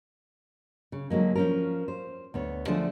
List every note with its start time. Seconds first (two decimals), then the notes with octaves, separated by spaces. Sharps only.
0.92 C#3
1.10 D3 F#3 G#3 A#3
1.36 F3 C#4 A#4
1.88 C5
2.34 D2 B3 C#5
2.67 D3 F3 A3 D4 G#4 C5